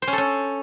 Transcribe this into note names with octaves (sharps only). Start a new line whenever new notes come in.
C5
C#4
A4
C#4